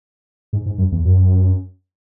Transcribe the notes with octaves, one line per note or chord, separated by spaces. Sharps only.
G#2
G#2
F#2
E2
F#2